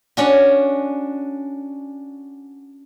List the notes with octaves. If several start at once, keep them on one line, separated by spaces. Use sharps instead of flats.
C#4 D4 F#4